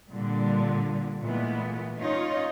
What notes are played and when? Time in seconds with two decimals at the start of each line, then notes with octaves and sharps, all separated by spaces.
0.13 A#2 D3 G3
1.21 A#2 E3 G#3 A3 B3
1.97 C#4 D#4 F4 C#5